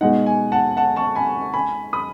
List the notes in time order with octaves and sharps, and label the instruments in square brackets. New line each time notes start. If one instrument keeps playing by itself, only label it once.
[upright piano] B2 G#3 D#4 [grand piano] F#5
[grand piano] G#5
F#5 A5
F#5 A5
A5 C#6
G#5 B5
G#5 B5
B5 D#6